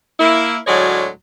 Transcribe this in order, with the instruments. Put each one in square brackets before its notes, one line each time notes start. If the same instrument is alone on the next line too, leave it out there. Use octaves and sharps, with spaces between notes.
[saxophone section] A#3 E4
D2 A2 F#3 G#3 C#5 D5